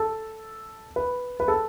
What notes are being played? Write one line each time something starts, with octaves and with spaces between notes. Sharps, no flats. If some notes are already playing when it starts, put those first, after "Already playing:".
Already playing: A4
B4
B4
A4